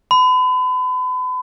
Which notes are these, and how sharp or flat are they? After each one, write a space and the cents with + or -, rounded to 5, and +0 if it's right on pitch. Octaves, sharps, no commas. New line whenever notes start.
B5 +40